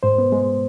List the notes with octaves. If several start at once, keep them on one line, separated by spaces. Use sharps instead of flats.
G#2 C5
B3
G#3